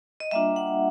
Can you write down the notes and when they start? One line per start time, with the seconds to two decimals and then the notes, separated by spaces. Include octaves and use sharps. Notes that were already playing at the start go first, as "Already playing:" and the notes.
0.20 D#5
0.31 G3 A#3 D4 F4 E5
0.56 F#5